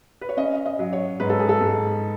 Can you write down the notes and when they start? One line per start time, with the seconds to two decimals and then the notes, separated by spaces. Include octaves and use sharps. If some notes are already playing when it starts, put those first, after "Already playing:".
0.21 B4
0.29 C#5
0.37 C#4 D#5
0.66 D#5
0.79 F#3
0.93 C#5
1.20 G#2 B4
1.29 A4
1.39 G#4
1.49 A4
1.61 G#2